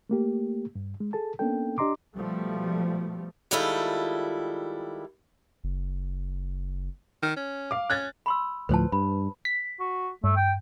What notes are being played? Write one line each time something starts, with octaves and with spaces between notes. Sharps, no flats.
A3 A#3 G4
G2
G#3
G#4 A4 A5
A#3 B3 C#4 D4 A4 G5
D4 G4 D#5 A#5 C6 D6
B2 F3 G3 A3
D#3 G3 G#3 E4 F4 A4
F#1
D#3
C#4
F5 D6
C#4 F#6 G#6 A6
B5 C6 E6
D2 A2 F3 B4 C5 A5
G2 B5
B6
F#4
G2 A3
G5